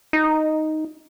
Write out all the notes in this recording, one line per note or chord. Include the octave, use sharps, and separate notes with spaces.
D#4